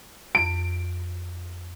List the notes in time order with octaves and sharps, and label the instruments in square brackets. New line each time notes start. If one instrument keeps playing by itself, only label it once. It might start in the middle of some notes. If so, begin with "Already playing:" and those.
[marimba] F2 [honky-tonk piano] D7